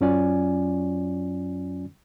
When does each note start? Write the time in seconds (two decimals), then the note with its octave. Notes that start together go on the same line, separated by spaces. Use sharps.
0.01 F#2 F#3 C#4 F4 D5 G#5